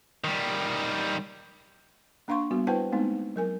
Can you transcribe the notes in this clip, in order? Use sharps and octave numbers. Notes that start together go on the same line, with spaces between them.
D#3 G3
A#3 D4 F5 C6 C#6
G3 B3 F#4
E4 B4 C5 F#5 G5 A5
G#3 A3 B3 C4 D#4
F#3 A#4 G#5